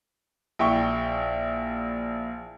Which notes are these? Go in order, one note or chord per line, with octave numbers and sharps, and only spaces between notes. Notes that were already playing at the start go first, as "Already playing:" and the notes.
A#1 E4 E5 G5 C#6